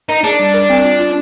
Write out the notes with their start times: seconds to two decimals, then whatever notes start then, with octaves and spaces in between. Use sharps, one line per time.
0.09 D#4 A#4
0.24 D4 G#4
0.39 G3
0.54 A#4
0.70 C4
0.85 F4
1.00 F4